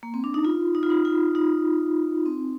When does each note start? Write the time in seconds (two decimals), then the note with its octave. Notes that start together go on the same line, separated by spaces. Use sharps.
0.03 A#3
0.14 C4
0.24 D4
0.34 D#4
0.45 F4
0.75 D#4
0.83 F4
0.90 D#4
1.05 F4
1.35 D#4
2.26 C4